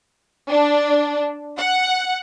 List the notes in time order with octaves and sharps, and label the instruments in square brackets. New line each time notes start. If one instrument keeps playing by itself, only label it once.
[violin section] D4
F#5